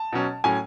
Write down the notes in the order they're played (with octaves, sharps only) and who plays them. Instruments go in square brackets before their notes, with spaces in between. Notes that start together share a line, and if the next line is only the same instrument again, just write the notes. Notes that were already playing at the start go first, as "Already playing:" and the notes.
Already playing: [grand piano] A5
B2 F#3 C#4
A2 F#3 C#4 G#5